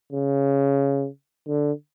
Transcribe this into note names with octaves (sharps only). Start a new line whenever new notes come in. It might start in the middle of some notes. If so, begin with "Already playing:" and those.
C#3
D3